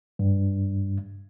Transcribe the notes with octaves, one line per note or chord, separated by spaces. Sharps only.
G2